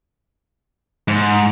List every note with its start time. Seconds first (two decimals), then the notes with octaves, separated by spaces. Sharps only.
1.08 G#2